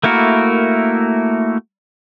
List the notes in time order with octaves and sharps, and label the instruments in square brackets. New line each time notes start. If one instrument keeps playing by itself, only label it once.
[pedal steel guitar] A3 A#3 E4 F#4 A#4